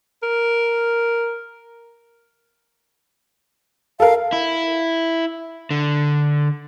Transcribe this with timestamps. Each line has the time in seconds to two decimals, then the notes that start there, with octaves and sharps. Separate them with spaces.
0.23 A#4
4.00 A4 A#4 F5
4.33 E4
5.71 D3